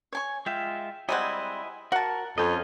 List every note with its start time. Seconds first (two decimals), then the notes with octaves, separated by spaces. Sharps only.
0.13 C#5 G#5 C#6
0.46 G#3 F4 E5 G5
1.09 G3 G#3 C4 E4 D#5 F#5 G#5 A#5
1.92 F#4 A#4 F#5 A5
2.38 F2 C#4 F4 A4 D#5 G5